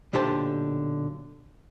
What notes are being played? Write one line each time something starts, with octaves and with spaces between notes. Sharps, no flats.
B1 A#2 D3 G4 C5 A5